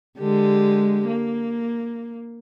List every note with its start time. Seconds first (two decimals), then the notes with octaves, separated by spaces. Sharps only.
0.19 D3 G#3 G4
1.07 A#3